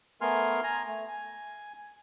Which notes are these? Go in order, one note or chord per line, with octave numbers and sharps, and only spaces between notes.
A3 B3 A#4 G#5 C6 F6
G#5 A#5
A3
G#5